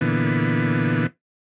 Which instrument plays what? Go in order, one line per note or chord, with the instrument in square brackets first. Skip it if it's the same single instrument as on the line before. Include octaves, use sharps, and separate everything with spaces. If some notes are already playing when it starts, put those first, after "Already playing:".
[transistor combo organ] A#2 D3 E3 B3